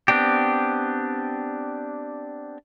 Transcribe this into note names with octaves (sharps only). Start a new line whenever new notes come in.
B3 C4 D4 G4